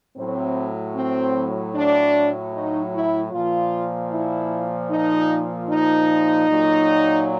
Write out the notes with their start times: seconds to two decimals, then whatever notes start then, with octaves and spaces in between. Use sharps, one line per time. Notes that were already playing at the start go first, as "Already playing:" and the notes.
0.16 A2 F#3 C4
0.95 C4
1.74 D4
2.54 D#4
2.93 E4
3.32 A#2 F3 F4
4.11 E4
4.90 D#4
5.69 D#4
6.48 A#2 F#3